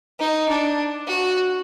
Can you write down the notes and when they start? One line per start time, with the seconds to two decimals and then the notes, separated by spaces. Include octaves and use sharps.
0.19 D#4
0.49 D4
1.07 F#4